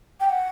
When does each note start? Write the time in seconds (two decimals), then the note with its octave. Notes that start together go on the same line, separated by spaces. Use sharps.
0.20 G5
0.29 F#5